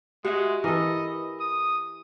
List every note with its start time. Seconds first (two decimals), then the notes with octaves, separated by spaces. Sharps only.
0.25 G#3 F#4 G4 E5
0.64 E3 A4 A#4 D#5
1.40 D#6